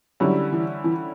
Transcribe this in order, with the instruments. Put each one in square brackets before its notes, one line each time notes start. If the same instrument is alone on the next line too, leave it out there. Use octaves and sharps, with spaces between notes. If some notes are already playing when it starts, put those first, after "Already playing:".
[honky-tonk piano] D3 G3 C#4 E4 [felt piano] F#3
[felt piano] E3
E3